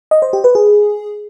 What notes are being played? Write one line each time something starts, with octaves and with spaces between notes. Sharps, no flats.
D#5
C5
G4
B4
G#4